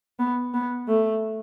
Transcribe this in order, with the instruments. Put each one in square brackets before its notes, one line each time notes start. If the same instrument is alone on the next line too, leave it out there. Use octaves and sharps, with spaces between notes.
[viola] B3
B3
A3